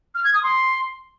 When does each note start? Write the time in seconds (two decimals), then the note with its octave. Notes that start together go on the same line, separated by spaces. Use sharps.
0.15 F6
0.24 G#6
0.34 D#6
0.43 C6